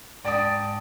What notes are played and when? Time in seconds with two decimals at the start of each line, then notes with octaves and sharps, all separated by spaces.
0.25 G#2 D5 G5 A5 D#6